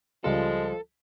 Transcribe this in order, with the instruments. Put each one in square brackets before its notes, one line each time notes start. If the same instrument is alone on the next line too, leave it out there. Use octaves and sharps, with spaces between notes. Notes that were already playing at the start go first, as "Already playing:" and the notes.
[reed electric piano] C#2 G3 F4 [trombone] F3 [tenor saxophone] G#3 [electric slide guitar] A4